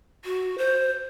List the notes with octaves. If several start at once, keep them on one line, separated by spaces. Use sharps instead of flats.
F#4
C5